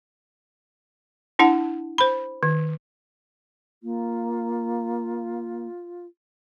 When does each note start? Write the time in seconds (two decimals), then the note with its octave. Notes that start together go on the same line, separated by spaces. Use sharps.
1.39 D4 E4 F#5 A5
1.98 C5 B5
2.43 D#3
3.83 A#3 F4